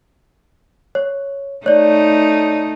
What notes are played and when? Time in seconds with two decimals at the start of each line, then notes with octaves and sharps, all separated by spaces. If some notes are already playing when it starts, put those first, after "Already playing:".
0.95 C#5
1.66 A3 D#4 C#5 D5